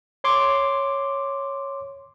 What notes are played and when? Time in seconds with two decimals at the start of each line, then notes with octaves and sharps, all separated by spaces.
0.24 C#5 C6 D6